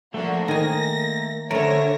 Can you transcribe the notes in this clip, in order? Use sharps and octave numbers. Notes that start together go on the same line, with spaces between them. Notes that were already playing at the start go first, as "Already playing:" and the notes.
F3 A3 A#3 D4 F#4
D#3 G#5 A#6
D3 A3 C#4 A#4 C#5 E5 A#6